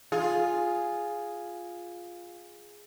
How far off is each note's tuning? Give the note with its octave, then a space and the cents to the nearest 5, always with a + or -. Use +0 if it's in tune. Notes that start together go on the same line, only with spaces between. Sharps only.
F4 +5 G#4 +0